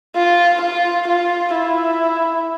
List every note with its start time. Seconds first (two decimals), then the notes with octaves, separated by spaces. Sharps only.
0.16 F4
0.62 F4
1.08 F4
1.54 E4